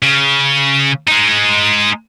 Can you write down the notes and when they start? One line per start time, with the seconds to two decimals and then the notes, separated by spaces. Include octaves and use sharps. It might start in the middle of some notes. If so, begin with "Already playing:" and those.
0.02 C#3
1.07 G#3 D#4